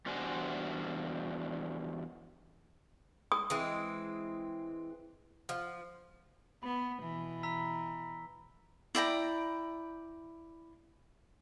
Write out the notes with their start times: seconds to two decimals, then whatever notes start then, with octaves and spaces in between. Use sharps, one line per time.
0.06 E2 G3 D4 F#4 C5 G#5
3.32 D#6
3.50 E3 G#3 C4
5.49 F3
6.63 B3 B5
7.01 B2 E3
7.43 A#5 E6 B6
8.95 E4 D5 G5 A#5